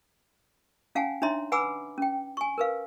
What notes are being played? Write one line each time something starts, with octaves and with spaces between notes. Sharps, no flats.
C#4 F5 F#5 G#5 A5
D4 D#4 C#5 E5 A#5 C6
B4 F#5 G#5 B5 D6 E6
C#4 G5
G#5 C#6
A#4 B4 F5